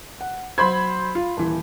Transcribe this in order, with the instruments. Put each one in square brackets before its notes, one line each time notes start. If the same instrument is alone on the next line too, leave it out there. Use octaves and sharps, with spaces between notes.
[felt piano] F#5
[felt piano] F#3 C5 [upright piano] B5 C6 G#6
[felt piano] F4
D#1 E3